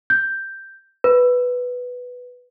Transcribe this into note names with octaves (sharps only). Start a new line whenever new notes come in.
G6
B4